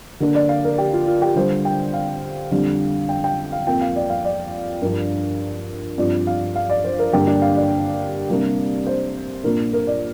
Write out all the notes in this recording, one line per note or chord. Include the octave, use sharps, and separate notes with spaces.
D3 A#3 D4
D5
F5
A#4
G4
F4
F4
G4
D3 G3 D4 C5
G5
F5
F2 D3 G3 D4
G5
G5
F5
F2 F3 A#3 G5
F5
D5
F5
D5
G2 F3 D4 A#4
G2 F3 C4 D5
F5
F5
D5
C5
A#4
G2 D3 G3 A#3 G4
D4
F5
D5
C3 G3 A#3 D4
C5
A#2 A#3 D4 A#4
A#4
D5